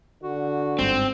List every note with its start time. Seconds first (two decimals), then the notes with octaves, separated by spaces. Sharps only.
0.23 D3 F#4
0.79 G1 G#2 C4